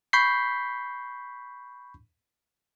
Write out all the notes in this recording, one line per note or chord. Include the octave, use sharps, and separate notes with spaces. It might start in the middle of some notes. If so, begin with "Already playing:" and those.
B5 C#6 G6 B6 C7